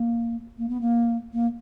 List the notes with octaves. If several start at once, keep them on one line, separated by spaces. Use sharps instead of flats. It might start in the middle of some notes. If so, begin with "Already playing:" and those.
Already playing: A#3
A#3
B3
A#3
A#3